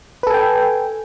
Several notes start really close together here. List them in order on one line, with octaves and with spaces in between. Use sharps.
B4 A4 G#5 G5